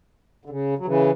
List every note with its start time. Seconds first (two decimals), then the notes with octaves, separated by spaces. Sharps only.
0.45 D3
0.50 C#3
0.79 F#3
0.85 C#3 E3